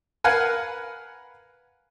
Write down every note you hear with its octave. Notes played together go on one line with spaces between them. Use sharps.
A#4 B4 F5 F#5 G#5